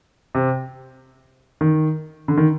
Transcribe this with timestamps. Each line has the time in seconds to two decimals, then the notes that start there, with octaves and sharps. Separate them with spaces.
0.35 C3
1.61 D#3
2.28 D3
2.37 D#3